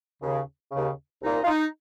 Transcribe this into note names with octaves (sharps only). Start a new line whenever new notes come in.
D#2 C#3
D#2 C#3
C2 A#2 D#4
F4
D#4